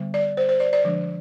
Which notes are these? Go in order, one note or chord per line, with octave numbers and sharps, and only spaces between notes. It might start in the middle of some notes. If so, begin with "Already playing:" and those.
Already playing: D3 G3 B3
D5
C5
C5
D5
D5
D3 F3 G#3 D4